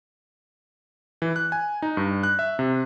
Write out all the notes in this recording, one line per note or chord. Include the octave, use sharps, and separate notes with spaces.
E3
F#6
G#5
D#4
G2
F#6
E5
C3